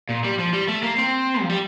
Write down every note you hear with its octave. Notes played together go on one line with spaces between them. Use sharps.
A#2
G3
F3
G3
A3
A#3
C4
F3
G3